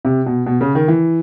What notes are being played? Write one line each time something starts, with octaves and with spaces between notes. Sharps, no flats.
C3
B2
B2
C#3
D#3
E3